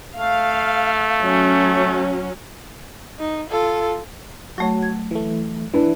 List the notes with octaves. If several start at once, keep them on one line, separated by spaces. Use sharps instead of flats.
A3 F5
F#3 C#4
D#4
F4 A4
F#3 A3 F#4 C#5
G#6
E3 A3
E3 D4 E4 B4